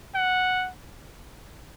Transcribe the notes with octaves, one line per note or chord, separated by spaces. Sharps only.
F#5